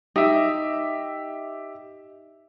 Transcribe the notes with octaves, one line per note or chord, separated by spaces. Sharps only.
D#4 G4 E5